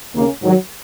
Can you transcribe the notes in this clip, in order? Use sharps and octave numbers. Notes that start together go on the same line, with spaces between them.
D#2 C#3 A#3 C#4
G#2 D#3 F#3